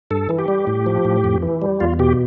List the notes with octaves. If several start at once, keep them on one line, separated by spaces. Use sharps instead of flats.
G2 A4
E3
G4
G3
A2
F3
A2
F2
E3
G3
E2 F4
B2 G4